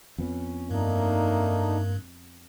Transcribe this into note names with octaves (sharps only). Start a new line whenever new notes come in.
F2 B3 C#4
G2 A3 A#3 D4 D#4